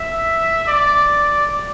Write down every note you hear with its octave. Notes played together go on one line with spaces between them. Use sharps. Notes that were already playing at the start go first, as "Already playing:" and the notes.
Already playing: E5
D5